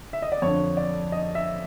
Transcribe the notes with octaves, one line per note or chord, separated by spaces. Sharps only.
E5
D#5
D5
F2 D3 C#5
D5
D#5
E5